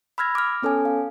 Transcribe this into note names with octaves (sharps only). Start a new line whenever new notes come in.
B5 E6 F6 G#6 A#6
D6 F6
B3 C#4 A4 C#5 G#5
F5